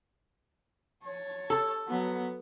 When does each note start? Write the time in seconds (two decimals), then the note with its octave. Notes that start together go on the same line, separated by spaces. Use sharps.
1.03 C#5 A5
1.50 A4
1.88 F#3 B3